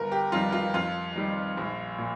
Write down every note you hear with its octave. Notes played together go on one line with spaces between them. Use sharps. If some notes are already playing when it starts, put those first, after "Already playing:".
Already playing: G1 A#4
G4
F2 D#3 G3 F4
F4
F2 F4
D#3 G3
A#1
A#2